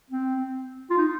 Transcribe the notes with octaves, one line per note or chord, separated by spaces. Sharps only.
C4
F4
D#4